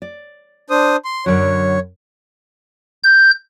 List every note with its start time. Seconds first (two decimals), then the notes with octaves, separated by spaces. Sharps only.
0.02 D5
0.70 D4 C5 D#6
1.05 C6
1.26 F#2 D3 F#3 C#5
3.03 G6